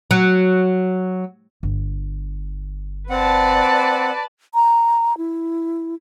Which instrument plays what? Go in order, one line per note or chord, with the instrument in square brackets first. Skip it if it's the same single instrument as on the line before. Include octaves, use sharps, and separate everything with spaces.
[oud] F#3
[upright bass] G1
[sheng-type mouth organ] C4 F#5 [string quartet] B4 D5 A5
[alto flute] A#5
E4